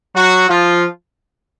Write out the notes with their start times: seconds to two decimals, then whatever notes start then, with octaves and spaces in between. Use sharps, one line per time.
0.15 F#3 F#4
0.48 F3 F4